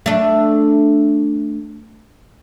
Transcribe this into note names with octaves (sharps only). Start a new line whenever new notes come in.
A3 D4